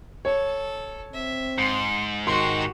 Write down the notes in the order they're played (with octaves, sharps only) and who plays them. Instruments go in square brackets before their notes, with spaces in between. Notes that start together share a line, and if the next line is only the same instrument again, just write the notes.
[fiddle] A4 [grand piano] C#5
[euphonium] C4 [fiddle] E5
[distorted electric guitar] G#2 [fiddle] C6
[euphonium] D#3 [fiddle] F#4 G4 [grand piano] C6